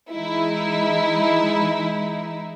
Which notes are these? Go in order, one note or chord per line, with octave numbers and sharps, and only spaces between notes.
E3 G#3 D#4 E4